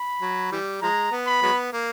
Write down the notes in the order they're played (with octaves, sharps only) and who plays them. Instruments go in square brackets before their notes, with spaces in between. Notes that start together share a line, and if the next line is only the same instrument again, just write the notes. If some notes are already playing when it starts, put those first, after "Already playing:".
Already playing: [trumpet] B5
[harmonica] F#3
E3 G3
[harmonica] F3 G#3 [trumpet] A#5
[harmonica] B3
[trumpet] B5
[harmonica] F#3 G#3 B3
A#3